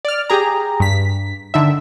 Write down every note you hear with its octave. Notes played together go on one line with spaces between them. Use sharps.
D5 F6
G4 G#4 A#5
G2 B6
D3 D#3 E5